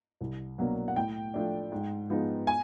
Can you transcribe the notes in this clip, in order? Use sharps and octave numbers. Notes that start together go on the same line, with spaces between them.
C2
B2 F#3 A#3 D4
F#5
A2 G5
F3 A3 D4
G#2
F3 G#3 B3 D#4
G#5